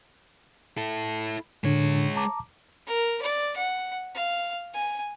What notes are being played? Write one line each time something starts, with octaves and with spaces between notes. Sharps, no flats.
E4 A4
A2 D3 G#3 D4 C#5
A5 A#5 D6
A#4
D5
F#5
F5
G#5